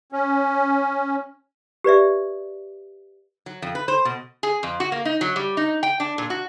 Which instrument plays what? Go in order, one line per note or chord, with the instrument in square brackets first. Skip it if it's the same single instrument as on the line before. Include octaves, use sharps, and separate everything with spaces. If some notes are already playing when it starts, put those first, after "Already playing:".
[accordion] C#4
[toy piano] G4 B4 D5 E5
[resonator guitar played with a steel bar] F#3
F2
B4
C5
B2
G#4
F2
F#4
A#3
D#4
F#3
G3
D#4
G5
D4
A#2
F#4